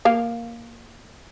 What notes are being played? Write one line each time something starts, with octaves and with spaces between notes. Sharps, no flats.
A#3 F5